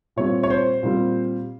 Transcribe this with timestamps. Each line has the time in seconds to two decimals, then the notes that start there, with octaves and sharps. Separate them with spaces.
0.16 A#2 G3 C4 C#5
0.43 C#5
0.50 C5
0.83 A#2 G3 C4